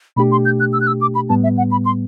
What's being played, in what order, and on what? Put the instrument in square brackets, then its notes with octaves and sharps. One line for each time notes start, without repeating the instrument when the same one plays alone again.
[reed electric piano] B2 A3 D4 G4 [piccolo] B5
[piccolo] C6
G6
F#6
E6
F#6
E6
D6
B5
[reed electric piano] A2 G3 B3 [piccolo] A5
[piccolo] E5
F#5
B5
C6